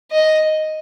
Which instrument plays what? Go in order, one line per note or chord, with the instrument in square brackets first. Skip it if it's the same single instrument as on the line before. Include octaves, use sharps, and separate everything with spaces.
[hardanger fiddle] D#5